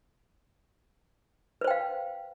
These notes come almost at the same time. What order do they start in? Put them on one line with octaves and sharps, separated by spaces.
B4 C5 G5 F5